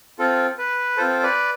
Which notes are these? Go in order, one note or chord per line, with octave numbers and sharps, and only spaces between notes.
C4 F4 A4
B4
C4 F4 A4 C5
B4 D5